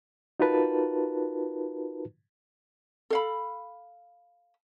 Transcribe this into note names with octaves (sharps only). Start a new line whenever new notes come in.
D#4 F4 F#4 A#4 B4 A5
A4 F5 B5